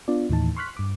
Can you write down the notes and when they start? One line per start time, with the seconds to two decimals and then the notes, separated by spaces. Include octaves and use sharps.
0.08 B3 D4 F4 D5
0.30 D#2 A2 E3 D#4 A5
0.56 C6 C#6 F6 F#6 B6
0.77 G2 D6